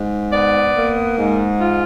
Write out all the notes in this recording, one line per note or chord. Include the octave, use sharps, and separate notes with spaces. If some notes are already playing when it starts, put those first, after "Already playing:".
Already playing: G#2
B3 D5
A#3
G#2
F4